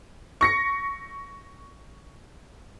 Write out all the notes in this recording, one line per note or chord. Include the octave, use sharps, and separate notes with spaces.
C#6 A#6 C#7